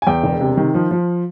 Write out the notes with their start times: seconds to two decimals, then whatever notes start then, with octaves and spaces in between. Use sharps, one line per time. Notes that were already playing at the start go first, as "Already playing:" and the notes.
0.02 G#5
0.07 E2 G5
0.23 E1
0.41 C3
0.57 D#3
0.74 F3
0.91 F3